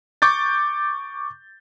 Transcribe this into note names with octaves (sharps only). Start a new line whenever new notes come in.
C#6 D6 G6 A6